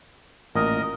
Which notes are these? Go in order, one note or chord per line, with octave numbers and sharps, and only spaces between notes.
A1 A#2 A#4 D#5